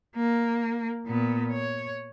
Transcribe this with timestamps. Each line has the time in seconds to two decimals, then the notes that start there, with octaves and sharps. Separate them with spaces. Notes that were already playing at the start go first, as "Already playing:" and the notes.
0.16 A#3
1.06 A#2 B3
1.52 C#5